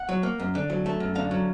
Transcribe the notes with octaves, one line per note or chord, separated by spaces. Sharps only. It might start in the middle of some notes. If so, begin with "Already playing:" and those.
Already playing: F#5
F#3
A#3
F#2
D3
F#3
A3
F#2
D3 F5
F#3